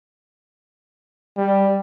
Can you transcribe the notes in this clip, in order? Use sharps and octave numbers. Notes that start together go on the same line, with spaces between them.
G3